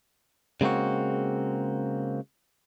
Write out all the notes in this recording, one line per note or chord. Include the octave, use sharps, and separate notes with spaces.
C#3 G#3 A#3 C4 F#4